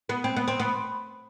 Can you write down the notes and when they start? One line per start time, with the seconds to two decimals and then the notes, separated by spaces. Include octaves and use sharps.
0.09 B3
0.24 C4
0.36 B3
0.48 C4
0.60 B3